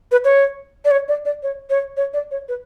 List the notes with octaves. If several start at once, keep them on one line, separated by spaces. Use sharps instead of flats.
B4
C#5
D5
C#5
D5
D5
C#5
C#5
C#5
D5
C#5
B4